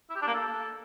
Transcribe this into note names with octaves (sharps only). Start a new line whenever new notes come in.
E4
G4
D4
A#3
A4